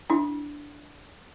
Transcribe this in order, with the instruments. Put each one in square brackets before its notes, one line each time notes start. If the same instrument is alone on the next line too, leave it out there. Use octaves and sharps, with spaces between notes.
[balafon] D4 E4